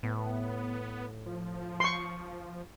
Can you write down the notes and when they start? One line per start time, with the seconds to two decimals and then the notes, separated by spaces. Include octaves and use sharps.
0.03 A2 B3
1.26 F3
1.80 C6 C#6